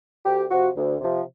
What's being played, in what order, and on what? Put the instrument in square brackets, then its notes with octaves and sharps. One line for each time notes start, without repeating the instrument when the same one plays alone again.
[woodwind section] D2 G4
C3 F3 F#4
D2
C3 F3